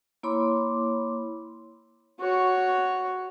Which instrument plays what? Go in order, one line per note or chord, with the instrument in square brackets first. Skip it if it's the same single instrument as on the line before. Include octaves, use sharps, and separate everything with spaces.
[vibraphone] A#3 E4 C#5 B5 C6 D6
[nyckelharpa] F#4 C#5